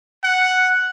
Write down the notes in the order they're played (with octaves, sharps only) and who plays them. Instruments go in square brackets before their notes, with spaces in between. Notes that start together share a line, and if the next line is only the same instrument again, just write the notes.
[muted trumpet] F#5